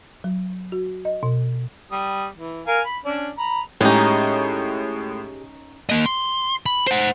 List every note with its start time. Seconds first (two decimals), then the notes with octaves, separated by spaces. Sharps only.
0.24 F#3
0.72 F#4
1.05 D#5
1.23 B2
1.92 G3 D#6
2.36 E3
2.67 A#4 F5 G#5
2.85 B5
3.05 C#4 D4 D5
3.38 A#5 B5
3.81 A2 G#3 C#4 D#4 G4 G#4
5.90 A#3 D#5
6.06 C6
6.66 B5
6.87 C5 F#5